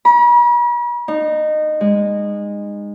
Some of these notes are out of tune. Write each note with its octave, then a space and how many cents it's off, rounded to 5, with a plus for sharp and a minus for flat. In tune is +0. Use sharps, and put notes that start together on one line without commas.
B5 -45
D#4 -20
G#3 -25